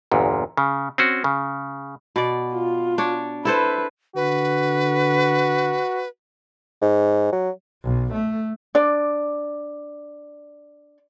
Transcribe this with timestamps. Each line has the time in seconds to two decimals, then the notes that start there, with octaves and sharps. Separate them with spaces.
0.12 G1 E2 A#2
0.57 C#3
0.98 C4 C#4 F#4
1.24 C#3
2.16 B2 D5
2.54 F4
2.98 D4 C#5
3.45 E4 A4 B4 C5
4.16 D3 F#4 B4
6.82 G#2
7.32 F#3
7.84 B1
8.13 A3
8.75 D4 D5